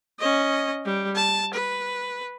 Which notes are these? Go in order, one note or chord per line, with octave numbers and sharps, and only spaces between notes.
C#4 D#5
G3
A5
B4